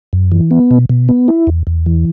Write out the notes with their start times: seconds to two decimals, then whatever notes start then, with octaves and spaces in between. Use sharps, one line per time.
0.13 F#2
0.32 E3
0.51 B3
0.71 B2
0.90 B2
1.09 B3
1.28 E4
1.47 E2
1.67 E2
1.86 E3